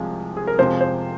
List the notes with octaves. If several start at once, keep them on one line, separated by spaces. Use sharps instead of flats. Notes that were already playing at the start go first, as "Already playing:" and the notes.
Already playing: C2 C3 F3 G#3
G#4
A#4
F2 C3 F3 G#3 C5
C5